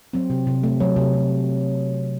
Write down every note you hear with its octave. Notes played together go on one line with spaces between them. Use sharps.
F#3 C4
C3
C3
A3
F#3
C3
C3